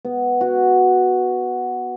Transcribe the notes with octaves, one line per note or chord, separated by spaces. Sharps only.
B3
F#4